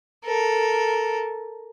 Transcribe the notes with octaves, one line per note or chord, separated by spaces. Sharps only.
A4 A#4